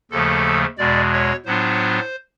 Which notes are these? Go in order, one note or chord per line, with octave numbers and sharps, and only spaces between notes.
D#2 C#3 F3 A3 A4
E2 B2 G#3 D5
C#5
A2 F#3 B3 D4 F4 C5